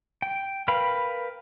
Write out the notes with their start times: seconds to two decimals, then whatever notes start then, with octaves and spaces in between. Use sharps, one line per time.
0.22 G5
0.68 A#4 B4 F5 G5 B5